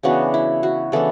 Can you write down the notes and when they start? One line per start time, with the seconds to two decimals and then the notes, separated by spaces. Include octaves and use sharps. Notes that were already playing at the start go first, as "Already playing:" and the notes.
0.03 C#3 E3 B3 D4 F#4
0.34 E4
0.63 F#4
0.92 C#3 E3 B3 D4 A4